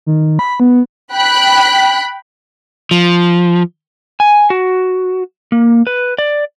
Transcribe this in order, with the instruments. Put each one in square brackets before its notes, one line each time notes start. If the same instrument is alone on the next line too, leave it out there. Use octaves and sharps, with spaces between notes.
[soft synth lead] D#3
B5
B3
[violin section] G5 B5 F#6 B6
[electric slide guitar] F3
G#5
F#4
A#3
B4
D5